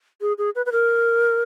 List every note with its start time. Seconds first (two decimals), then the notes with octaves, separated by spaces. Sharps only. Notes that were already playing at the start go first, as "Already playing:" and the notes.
0.21 G#4
0.38 G#4
0.55 B4
0.66 B4
0.72 A#4